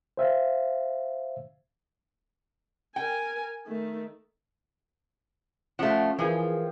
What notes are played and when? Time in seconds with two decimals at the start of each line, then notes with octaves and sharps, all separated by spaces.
0.17 C5 E5 F5
2.96 A#4 G5 G#5
3.67 D#3 A3
5.79 F3 A3 C#4 F#5
6.19 E3 F3 G#4 A#4 G5